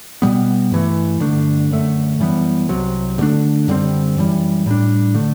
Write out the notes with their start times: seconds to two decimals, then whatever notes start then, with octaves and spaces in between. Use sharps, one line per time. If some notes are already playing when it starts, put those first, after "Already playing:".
0.22 B2 G3 B3
0.72 G2 E3 A3
1.20 G2 D3 A3 D4
1.70 F#2 D3 A3
2.19 F#2 E3 G3 B3
2.69 C2 C3 F#3
3.18 D2 D3 A3 D4
3.68 F#2 D3 G3 C4
4.16 F#2 E3 G3
4.66 A2 G3 D4
5.14 D3 A3